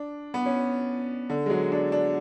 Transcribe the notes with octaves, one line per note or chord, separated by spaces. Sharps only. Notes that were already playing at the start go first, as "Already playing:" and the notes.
Already playing: D4
B3
C#4
D3
G#3
F#3
D4
D4